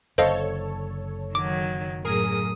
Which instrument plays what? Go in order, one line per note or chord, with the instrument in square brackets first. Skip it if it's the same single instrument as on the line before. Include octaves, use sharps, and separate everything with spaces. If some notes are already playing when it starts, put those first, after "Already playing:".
[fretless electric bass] F#1 D3 [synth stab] A4 C#5 [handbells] C5 D#5 F5
[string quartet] D#3 F#3 [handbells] D6
[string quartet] F#2 A2 D#6 [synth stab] G#4 A#4